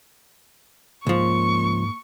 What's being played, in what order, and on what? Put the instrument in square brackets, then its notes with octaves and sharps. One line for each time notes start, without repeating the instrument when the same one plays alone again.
[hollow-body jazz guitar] C#2 F3 [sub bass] G#2 [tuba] A#3 [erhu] C#6